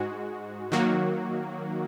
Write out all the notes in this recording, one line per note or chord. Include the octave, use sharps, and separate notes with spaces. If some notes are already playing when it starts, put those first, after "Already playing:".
Already playing: G#2 G#3 F#4
D#3 F#3 A#3 F#4